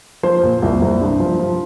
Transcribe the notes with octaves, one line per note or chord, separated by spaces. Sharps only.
F3 C5
A#2
C2
C2
G2
F3
F3